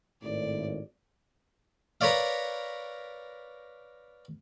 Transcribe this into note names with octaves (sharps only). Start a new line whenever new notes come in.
G#1 A2 D5
A#4 B4 C#5 D5 F5